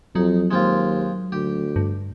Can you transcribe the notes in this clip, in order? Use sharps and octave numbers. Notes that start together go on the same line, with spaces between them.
F2 F#3 D#4
D#2 G#3 C4 F4
D2 G4
G2